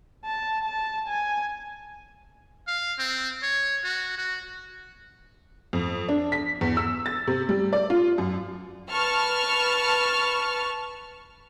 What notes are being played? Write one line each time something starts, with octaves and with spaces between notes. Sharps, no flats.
A5
A5
G#5
F5
C4
C#5
F#4
F#4
F2
D4
B6
E2
E6
A6
C3
G3
D5
F4
F#2
B4 A5 C#6 F6